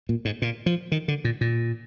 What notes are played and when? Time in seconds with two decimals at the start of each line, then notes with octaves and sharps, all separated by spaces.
0.09 A#2
0.25 G#2
0.42 A#2
0.66 F3
0.92 D#3
1.08 D3
1.24 A#2
1.41 A#2